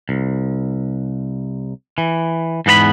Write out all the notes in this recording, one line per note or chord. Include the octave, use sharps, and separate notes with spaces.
C2
E3
E2 G#2 B3 A4 B5